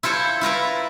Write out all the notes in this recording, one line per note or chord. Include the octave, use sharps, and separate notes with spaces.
E4 F4 A4 C5 C#5
E4 F4 A#4 B4